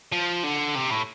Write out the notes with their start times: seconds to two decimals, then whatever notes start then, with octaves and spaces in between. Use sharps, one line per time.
0.12 F3
0.44 D3
0.76 C3
0.91 A2